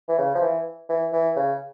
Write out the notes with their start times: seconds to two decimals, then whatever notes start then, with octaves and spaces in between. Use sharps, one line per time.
0.09 E3
0.18 C#3
0.35 F3
0.42 E3
0.89 E3
1.12 E3
1.36 C#3